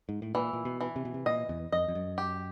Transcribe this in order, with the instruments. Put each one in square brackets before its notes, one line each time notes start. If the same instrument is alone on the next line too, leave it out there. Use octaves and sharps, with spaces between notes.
[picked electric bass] G#2
A2
[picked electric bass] A#2 [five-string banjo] E3
[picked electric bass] A#2
B2
[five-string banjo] E3
[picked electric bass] C3
B2
C3
[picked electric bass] A#2 [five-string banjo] D#5
[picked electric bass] E2
[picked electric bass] F2 [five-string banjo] D#5
[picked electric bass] F2
F#2
[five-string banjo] G4